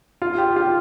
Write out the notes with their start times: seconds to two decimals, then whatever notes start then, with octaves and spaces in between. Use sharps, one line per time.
0.22 F4
0.38 G4
0.56 F4